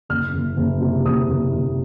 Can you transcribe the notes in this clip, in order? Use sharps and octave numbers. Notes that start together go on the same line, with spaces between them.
F#1 F6
F#1
F#1
C3
F#1 D#6
F#1
F#1